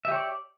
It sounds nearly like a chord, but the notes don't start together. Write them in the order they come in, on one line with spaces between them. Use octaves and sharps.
E5 G4 C#5 D5